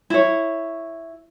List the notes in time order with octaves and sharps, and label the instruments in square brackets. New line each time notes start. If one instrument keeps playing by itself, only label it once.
[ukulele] E4 C#5